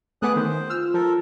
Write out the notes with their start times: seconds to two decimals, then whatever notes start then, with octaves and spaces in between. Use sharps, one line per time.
0.22 A3 B3 G#4 D6 D#6 F#6
0.36 D#3 C5
0.70 F4 E6 F6
0.94 F3 A4 A#4